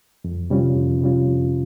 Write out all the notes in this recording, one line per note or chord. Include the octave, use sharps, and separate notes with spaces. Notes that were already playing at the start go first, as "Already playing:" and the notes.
F2
C3 G3 C#4 F4
F2
C3 G3 C#4 F4
F2